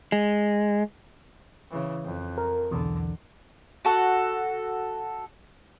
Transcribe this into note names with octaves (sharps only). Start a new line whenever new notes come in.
G#3
C#3 E3
F2
A#4
B1 E2 D3
F#4 A4